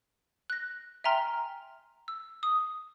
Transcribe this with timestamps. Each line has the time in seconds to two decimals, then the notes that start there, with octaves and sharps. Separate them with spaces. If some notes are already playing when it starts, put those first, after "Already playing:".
0.50 F#6 A#6
1.04 E5 G5 G#5 A#5 C6 F6
2.08 E6
2.43 D#6